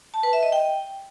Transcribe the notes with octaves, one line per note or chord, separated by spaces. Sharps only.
A5
B4
E5
D#5
G5